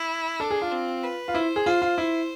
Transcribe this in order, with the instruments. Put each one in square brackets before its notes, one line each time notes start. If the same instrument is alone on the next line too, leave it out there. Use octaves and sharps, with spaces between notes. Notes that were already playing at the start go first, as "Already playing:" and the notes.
Already playing: [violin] E4
[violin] D4 [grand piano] A4
[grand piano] G#4
F4
[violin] C4
B4
[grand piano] F4
[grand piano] E4 [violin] C5
[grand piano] G#4
[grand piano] F4 [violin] C5
[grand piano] F4
E4